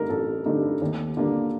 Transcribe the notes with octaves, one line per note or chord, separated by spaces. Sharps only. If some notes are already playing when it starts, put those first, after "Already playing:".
Already playing: G2 D3 A3 D#4 A#4
A1 A4
G2 D3 A3 D#4
D#2
D3 G3 A#3 D4